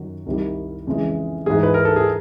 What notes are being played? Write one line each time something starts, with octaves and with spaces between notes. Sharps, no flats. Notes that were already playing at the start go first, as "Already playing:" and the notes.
Already playing: F#2 D#3 F#3
C2 C3 D#3 G3
F2 C#3 E3 G#3
G#2 E3 G#3 G#4
B4
A#4
A4
G#4